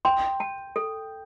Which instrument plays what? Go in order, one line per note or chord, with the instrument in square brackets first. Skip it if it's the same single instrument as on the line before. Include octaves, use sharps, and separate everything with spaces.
[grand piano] G5 [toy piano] C6
[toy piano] A5
A4